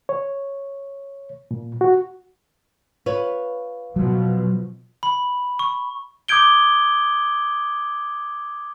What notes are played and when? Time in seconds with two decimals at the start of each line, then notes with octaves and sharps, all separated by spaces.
0.09 C#5
1.51 A#2
1.81 F#4
3.06 F4 B4 C#5
3.96 B2 F3 F#3
5.03 B5
5.59 C#6
6.28 D6 D#6 G6 G#6 D7 G7